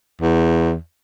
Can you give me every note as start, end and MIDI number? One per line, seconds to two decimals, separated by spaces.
0.22 0.76 40